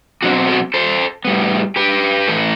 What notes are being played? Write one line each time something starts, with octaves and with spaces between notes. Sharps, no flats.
B2 F#3 C4 D4 F#4
F#4 A4
A4 C5
A2 G3 B3
G4 B4
A2 E3 A3